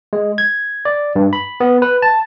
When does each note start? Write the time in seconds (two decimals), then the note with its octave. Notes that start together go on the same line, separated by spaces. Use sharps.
0.13 G#3
0.38 G#6
0.85 D5
1.16 G2
1.33 B5
1.60 B3
1.82 B4
2.02 A5